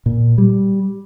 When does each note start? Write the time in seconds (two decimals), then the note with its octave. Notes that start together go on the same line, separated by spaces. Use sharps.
0.06 A#2
0.38 G3